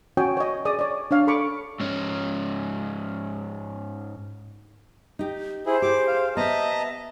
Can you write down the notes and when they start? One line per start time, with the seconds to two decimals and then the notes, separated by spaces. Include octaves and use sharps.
0.17 C#4 F#4 C#5 G5 G#5 D#6
0.37 C#5 D#5
0.65 G#4 D5 D#6
0.79 C#5 D5
1.11 D4 C#5 F5
1.27 A4 B5 C#6 D6
1.80 G#2 C#4
5.19 D#4 G4
5.66 E4 G#4 C5
5.82 G4 G#4 D6
6.07 F5
6.37 B3 C5 D#5 E5 A5 A#5